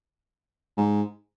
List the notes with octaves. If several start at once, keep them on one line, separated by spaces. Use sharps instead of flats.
G#2